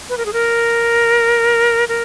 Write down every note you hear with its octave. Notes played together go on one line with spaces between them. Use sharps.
B4
A#4
G#4
A#4
A#4